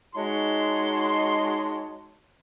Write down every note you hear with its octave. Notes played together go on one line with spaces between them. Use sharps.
G#3 D#4 F#4 C#5 A5 C6